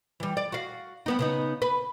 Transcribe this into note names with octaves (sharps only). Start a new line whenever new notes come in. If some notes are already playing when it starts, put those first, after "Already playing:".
E3 G3
D5
F#4 F5
G3 B3 D#4
C#3 B3 D#4
B4